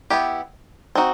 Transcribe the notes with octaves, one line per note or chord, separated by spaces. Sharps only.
B3 E4 G4
C4 D#4 F#4